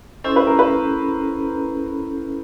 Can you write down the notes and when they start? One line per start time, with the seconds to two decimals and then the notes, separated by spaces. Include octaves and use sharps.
0.24 C#4 E4 A4 C5
0.36 B4
0.47 A#4
0.59 B4